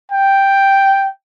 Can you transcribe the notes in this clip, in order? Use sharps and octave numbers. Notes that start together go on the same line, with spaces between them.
G5